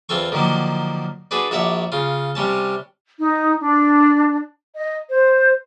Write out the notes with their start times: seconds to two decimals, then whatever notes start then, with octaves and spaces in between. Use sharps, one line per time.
0.09 E2 C4 F4 A4 C#6
0.32 D3 D#3 F3 F#3 A#3
1.31 D4 F#4 G#4 B4 D5
1.51 A#1 F#4 C#5 D5 E5 A5
1.92 C#3 F4
2.35 C3 G3 C#4 A5
3.19 D#4
3.60 D4
4.75 D#5
5.09 C5